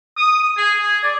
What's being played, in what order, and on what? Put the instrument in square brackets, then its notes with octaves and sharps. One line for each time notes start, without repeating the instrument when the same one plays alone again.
[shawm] D#6
G#4
G#4
D5